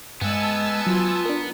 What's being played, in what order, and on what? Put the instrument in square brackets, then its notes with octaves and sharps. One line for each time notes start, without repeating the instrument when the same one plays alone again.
[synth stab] G2 [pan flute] G#3 [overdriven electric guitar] B3 [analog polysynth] G#5 A5 E6
[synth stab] F#3 [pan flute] F4
[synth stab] D4 A#4